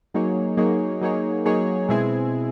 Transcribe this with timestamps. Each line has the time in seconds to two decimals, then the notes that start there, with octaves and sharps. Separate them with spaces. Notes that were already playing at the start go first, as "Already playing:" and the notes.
0.14 F#3 A#3 D#4 G#4 C#5
0.57 F#3 A#3 D#4 G#4 C#5
1.01 F#3 A#3 D#4 G#4 C#5
1.45 F#3 A#3 D#4 G#4 C#5
1.89 B2 G#3 C4 E4 G#4